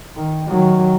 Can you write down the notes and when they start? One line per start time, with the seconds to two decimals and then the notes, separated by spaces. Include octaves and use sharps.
0.16 D#3
0.48 D#3 F#3